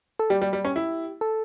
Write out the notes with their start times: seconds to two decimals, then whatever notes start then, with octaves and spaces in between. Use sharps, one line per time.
0.19 A4
0.30 G3 G4
0.42 G3
0.53 G3
0.65 C#4
0.76 E4
1.21 A4